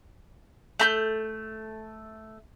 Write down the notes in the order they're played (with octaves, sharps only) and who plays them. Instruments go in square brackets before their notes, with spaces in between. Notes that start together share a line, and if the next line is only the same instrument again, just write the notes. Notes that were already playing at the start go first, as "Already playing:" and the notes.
[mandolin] A3 A#5 G6